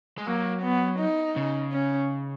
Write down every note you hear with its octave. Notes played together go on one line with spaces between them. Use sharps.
G#3
F#3 A#3
B3
D#4
C#3
C#4